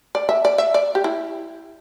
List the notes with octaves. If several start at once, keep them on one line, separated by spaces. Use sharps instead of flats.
D5
E5
D5
E5
D5
G4
E4